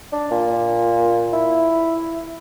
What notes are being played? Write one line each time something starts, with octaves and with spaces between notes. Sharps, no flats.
D4
A#2
E4